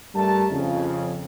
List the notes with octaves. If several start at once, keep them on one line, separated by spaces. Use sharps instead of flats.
G2 G3 A3 A#4 A5
F2 C#3